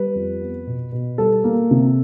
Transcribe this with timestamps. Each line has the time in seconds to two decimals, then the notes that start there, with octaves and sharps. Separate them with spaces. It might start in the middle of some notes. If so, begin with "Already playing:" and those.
Already playing: G3 B4
0.15 F2
0.41 B3
0.67 B2
0.92 B2
1.18 G3 A4
1.44 A#3
1.71 C3